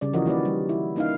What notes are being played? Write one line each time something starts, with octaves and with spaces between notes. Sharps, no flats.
C#3 G3 D5
E3 F3 F#4 A#4 C#5 D#5
D#3 A#3 F#4 G4 B4 D5
G3
E4
A#3 C#4 D#4 E4 F5